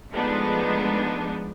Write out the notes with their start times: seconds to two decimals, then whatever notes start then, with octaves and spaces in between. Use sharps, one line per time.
0.12 F3 G#3 A3 B3 D4 D#4